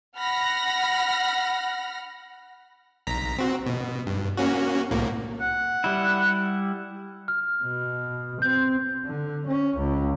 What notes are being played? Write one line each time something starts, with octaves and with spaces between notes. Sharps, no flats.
F#5 B5 F6 A#6
B1 A#5 B6
C4 F#4
B2
G2
A#3 C#4 F#4
C2 A2 A#3
F#5
G3 E4
F6
B2
C4 G6
D3
C#4
C#2